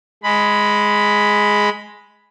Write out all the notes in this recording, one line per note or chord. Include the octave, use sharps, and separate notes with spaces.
G#3 B5